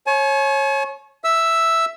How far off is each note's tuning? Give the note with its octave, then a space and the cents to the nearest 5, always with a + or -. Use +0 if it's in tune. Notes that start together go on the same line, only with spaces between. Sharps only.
C#5 -20 G#5 +45
E5 +0 E6 +0